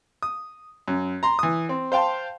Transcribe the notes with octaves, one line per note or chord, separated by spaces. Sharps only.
D#6
F#2
A#5 C6
E3 D#6
C4
C5 F5 G5 A5 C6